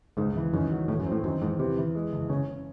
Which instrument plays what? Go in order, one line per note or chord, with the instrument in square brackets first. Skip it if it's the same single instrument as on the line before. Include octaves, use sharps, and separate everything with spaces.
[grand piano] C#2 [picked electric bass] G#2
[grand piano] E3
[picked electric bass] F#2 [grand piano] D#3
[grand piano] F#3
[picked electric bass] A2 [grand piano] E3
[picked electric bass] F#2
[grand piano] C4
[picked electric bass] A2
[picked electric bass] F#2 [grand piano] D#3
[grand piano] E2 [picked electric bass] G#2
[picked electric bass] C3 [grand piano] E3
[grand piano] E3
G#3
F#1
[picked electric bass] C#3 [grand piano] C#4
[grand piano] C#4